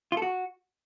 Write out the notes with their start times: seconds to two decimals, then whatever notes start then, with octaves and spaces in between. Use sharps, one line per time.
0.12 F4
0.17 A4
0.22 F#4